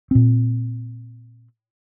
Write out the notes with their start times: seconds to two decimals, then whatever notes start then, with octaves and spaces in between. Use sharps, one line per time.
0.11 A#2 C4